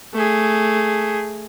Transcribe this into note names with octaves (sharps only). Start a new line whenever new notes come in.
A3 G#4